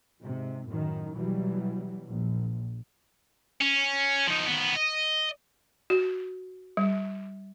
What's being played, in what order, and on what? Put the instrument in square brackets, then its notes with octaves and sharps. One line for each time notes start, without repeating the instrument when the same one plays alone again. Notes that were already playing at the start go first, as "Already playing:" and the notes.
[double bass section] G#2 C3
F#2 A2 D#3
B2 E3 F#3 G3
A#1
[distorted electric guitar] C#4
F3 D#4
D#3 B3
D#5
[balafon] F#4
G3